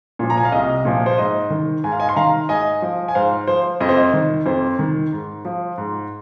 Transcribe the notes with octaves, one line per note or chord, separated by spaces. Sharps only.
A#2 F3
A#5
G#5
F5
C2 D#5
A#2 F3
C5
G#2 D#5
D#3
G#2 G#5
F5
D#5 G#5
C6
D#3 F5 A#5
G#2 D#5 G#5
F3
G#5
G#2 C5 F5
F3 C5
F2 D#5
C5
D#5
D#3
F2 C5
D#3
G#2
F3
G#2